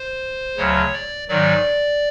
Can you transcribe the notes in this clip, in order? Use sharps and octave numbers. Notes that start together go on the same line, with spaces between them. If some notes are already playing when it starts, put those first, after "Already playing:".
Already playing: C5
D2 C#3 F#3 C#5
D5
G#2 D#3 F#3 D5